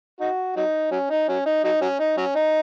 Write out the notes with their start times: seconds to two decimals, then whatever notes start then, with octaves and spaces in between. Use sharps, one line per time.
0.20 D#4 F#4
0.56 F#3 D#4
0.91 F#3 C#4
1.10 D#4
1.28 F#3 C#4
1.46 D#4
1.64 F#3 D#4
1.81 F#3 C#4
1.99 D#4
2.17 F#3 C#4
2.35 D#4